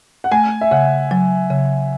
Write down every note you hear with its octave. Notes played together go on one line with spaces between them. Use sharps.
F#5
A3 G#5
E5
C#3 F#5
F#3
C#3